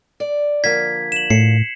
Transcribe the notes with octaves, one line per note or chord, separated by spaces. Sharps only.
D5
D3 F3 A#3 G#6 B6
E7 F#7
A2 C7 C#7